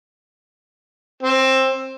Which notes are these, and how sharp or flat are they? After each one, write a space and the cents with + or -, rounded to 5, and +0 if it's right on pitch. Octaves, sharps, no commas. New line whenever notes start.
C4 +15